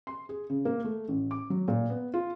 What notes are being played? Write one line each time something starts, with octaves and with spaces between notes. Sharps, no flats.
C6
G#4
C#3
A#3
A3
A1
D6
F#3
A#2
B3
F4